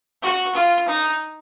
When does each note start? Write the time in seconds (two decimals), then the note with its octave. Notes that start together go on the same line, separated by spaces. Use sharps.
0.23 F#4
0.55 F4
0.88 D#4